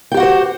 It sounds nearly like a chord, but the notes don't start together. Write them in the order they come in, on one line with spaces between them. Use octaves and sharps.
G5 G4 F#5 F#4 C5